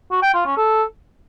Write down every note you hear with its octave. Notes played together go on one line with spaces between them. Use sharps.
F#4
G5
F4
C#4
A4